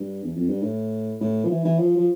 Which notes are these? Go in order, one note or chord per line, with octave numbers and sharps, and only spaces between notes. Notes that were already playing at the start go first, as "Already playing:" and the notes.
Already playing: G2
E2
F2
G2
A2
A2
F3
E3
E3
F3
F3